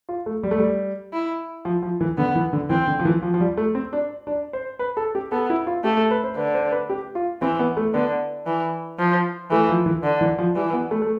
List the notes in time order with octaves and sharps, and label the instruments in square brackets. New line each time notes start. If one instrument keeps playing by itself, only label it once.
[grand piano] F4
A3
G3
A3
G3
[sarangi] E4
[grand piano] F3
F3
E3
[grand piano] D3 [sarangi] B3
[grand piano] E3
D3
[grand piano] E3 [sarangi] C4
[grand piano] D3
F3
E3
F3
F3
G3
A3
C4
D4
D4
C5
B4
A4
G4
[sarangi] B3 [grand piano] A4
[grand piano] E4
F4
[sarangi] A3 [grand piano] G4
[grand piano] A4
B4
C5
[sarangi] D3 [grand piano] B4
[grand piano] C5
B4
G4
F4
[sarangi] E3 [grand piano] C4
[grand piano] B3
A3
[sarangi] D3 [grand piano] B3
[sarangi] E3
F3
[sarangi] E3 [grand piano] A3
[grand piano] F3
E3
[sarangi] D3
[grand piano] E3
F3
[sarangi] E3 [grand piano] G3
[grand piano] B3
A3
A3